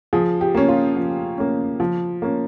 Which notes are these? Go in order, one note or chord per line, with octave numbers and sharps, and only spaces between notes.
F3 G#4
G4
A#3 C#4
F4
F3
A#3 C#4
F3
A#3 C#4